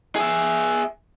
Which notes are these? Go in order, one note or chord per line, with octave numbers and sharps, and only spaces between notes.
G#4 E5